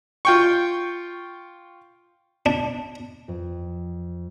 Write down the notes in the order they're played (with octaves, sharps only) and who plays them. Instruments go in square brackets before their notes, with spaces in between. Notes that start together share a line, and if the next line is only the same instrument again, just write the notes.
[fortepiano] F4 G5 C#6
[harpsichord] D4
[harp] F2